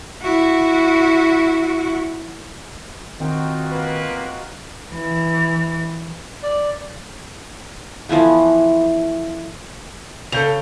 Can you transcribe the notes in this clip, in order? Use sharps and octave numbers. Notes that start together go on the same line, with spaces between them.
E4 F#4
D#3 C4 D#4 F4 F#4 G5
A#3 G4 B4
E3
D5
E3 F3 A3 B3
C#3 A4 G6 F7